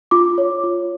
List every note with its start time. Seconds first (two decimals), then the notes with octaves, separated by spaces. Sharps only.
0.11 F4 D6
0.38 C#5
0.64 F4